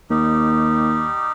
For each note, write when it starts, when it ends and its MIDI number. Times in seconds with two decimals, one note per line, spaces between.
0.10 1.10 39
0.10 1.32 55
0.10 1.32 63
0.10 1.32 67